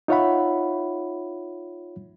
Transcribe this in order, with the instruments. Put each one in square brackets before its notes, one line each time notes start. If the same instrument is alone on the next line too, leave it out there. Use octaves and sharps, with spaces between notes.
[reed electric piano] D#4 F4 C#5 E5 F#5 B5